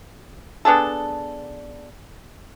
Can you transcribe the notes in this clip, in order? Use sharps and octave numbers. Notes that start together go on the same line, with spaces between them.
B3 D4 G#4 A4